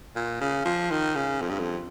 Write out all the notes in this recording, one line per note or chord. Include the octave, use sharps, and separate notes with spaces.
A#2
C#3
F3
D#3
C#3
F2
G2
F2